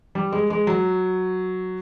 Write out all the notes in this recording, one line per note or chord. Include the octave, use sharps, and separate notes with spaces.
G3
G#3
G#3
F#3